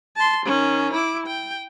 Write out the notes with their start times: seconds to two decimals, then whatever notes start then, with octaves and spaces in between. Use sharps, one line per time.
0.16 A5 C6
0.45 D#3 C#4
0.93 E4 D6
1.26 G5